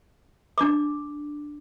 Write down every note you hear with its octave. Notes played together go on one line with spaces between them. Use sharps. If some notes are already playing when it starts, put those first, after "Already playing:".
D4 D6